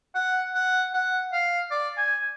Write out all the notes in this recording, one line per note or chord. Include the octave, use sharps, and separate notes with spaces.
F#5
F#5
F#5
F5
D5
G#5